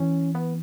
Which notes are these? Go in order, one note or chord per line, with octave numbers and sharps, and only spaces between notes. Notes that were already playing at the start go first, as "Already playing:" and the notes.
Already playing: E3 C#4
B3